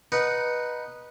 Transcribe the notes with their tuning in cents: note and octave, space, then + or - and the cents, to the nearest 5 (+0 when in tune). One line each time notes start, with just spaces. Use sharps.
D#4 -10 B4 -15 F#5 +0